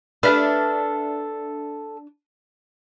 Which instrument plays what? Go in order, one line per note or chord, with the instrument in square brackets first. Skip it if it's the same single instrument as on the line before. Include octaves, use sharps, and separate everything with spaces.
[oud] D4 B4 [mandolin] A4 E5 F6